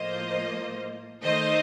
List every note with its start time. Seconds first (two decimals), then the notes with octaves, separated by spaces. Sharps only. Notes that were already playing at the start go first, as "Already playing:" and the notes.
Already playing: A2 F3 A#3 F4 C5 D#5
1.23 D#3 A3 D#4 C5 D#5